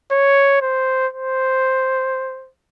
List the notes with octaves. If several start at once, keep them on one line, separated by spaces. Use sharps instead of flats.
C#5
C5
C5